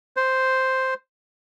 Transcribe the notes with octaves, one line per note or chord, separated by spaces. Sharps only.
C5